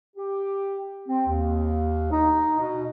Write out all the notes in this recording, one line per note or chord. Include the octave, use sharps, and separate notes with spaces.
G4
C4
D#2
D#4
B2